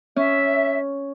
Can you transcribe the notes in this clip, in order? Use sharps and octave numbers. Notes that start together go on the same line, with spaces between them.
C#4 E5